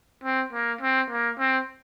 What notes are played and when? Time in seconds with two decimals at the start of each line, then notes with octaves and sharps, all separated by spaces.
0.24 C4
0.53 A#3
0.81 C4
1.10 A#3
1.39 C4